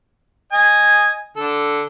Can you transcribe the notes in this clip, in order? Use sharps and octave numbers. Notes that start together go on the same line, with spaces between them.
D#5 G#5
D3 A4